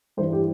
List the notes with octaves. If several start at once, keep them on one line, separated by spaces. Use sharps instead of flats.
G2 E3 C5
G4